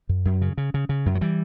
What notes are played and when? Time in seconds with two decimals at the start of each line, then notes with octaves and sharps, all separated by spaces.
0.09 F#2
0.25 F#2
0.42 C#3
0.58 C#3
0.74 C#3
0.89 C#3
1.06 F#2
1.15 F#3
1.21 E3 G3